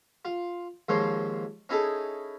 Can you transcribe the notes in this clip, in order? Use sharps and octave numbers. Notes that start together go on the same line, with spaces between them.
F4
D#2 G#2 F3 C#5 C6
C#4 D#4 E4 G#4 A4